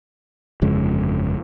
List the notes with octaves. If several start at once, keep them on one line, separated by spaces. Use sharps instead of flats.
G1 F2 C#3 G#3